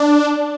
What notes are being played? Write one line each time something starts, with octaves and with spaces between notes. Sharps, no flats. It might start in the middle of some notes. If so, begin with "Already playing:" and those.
Already playing: D4